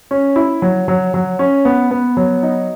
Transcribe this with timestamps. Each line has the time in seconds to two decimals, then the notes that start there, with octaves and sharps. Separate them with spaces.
0.11 C#4
0.36 E4
0.62 F#3
0.88 F#3
1.14 F#3
1.39 C#4
1.65 B3
1.91 B3
2.17 F#3
2.43 D#4